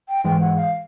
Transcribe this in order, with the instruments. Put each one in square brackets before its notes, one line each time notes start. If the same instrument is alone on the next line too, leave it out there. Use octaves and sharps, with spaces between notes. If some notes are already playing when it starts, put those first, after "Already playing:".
[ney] G5
[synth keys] G#2 E3 G#3 [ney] G5
[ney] F#5
F5